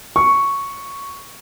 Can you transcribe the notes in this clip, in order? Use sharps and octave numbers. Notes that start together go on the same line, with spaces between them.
C#6